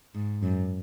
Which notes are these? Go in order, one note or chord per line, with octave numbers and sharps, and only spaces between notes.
G#2
F#2